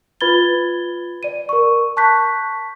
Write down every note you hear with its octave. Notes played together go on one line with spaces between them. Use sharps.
F4 B4 B5 G#6 A6 G7
D5 D#7
A#4 C#6
A5 C#6 F#6 G6 B6